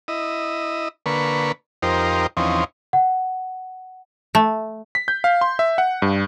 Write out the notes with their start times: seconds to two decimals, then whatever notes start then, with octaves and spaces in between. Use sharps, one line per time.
0.08 E4 D#5
1.06 D3 A#3 B4 C#6
1.82 F2 D#4 G4 A#4 C5
2.37 E2 F3 C4 C#4 D#4
2.93 F#5
4.35 A3
4.95 B6
5.08 G6
5.24 F5
5.41 C6
5.59 E5
5.78 F#5
6.02 G2